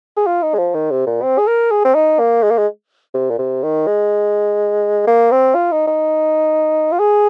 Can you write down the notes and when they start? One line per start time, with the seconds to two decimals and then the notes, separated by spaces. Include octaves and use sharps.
0.17 G#4
0.27 F4
0.42 D#4
0.54 G#3
0.58 F3
0.74 D#3
0.91 C3
1.07 A#2
1.22 C4
1.38 G#4
1.47 A#4
1.71 G#4
1.85 C4
1.95 D#4
2.19 A#3
2.43 G#3
2.51 A#3
2.58 G#3
3.14 C3
3.31 A#2
3.39 C3
3.63 D#3
3.87 G#3
5.07 A#3
5.31 C4
5.55 F4
5.72 D#4
5.87 D#4
6.92 F4
6.99 G#4